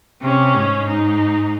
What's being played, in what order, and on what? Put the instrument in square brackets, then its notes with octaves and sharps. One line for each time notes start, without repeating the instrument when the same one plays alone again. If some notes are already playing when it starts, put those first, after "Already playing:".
[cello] C3 [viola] C#4
[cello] G#2
[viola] D#4